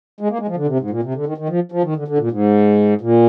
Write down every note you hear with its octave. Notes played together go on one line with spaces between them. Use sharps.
G#3
A#3
G#3
F3
D3
C3
G#2
A#2
C3
D3
D#3
D#3
F3
F3
D#3
D3
D3
A#2
G#2
A#2